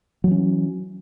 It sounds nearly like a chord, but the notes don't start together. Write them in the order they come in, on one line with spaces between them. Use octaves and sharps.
F#3 E3 C#4